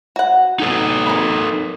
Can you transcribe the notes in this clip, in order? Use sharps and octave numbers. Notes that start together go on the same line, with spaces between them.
F#4 F#5
D#4 A4 B4
A#4 B5